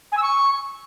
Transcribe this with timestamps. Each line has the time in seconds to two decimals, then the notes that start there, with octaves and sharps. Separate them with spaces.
0.12 G#5
0.17 E6
0.22 C#6